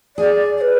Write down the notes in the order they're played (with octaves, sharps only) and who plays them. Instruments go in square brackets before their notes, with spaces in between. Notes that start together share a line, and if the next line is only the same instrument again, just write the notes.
[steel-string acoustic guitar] G#4 [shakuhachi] D5
[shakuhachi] D5
B4